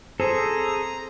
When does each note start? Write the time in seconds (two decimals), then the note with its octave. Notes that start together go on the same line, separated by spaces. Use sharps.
0.20 G#4 A4 C5 A#5